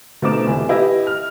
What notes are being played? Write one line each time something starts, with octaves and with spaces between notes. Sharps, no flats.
B2 A3 C4 D#4 D6 E7
E2 C3 E3
E4 G4 B4 D#5
F6